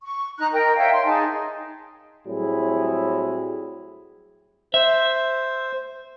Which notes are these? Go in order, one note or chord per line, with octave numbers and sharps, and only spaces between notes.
C#6
D#4 A#5 F#6
A#4 D#5 G5 A#5
C#5 E5 F5 G5
C6
D#4 G#4 G#5 A5
A2 F#3 G3 C4 E4 G#4
C5 E5